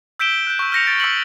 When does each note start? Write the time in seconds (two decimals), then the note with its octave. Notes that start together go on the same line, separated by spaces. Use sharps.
0.19 E6 G6 B6 D7 E7 G7
0.47 F#6 G6
0.59 C#6 E6
0.72 F6 G6 A#6 C#7 F7
0.87 A6 A#6 D7
1.00 C#6 E6 F6 B6 C#7 F#7